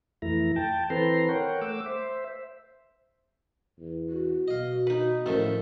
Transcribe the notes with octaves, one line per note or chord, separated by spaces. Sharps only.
F2 E3 A3 E4 A#5
G5 A5
E3 C4 A4 B4 A#5 C6
A#4 C#5 F#5 G5
A3 D6 E6
C5 E5
E2
F#4
B2 D#5 F5
D#4 B4
A2 D#3 F3 C#4 A4 E5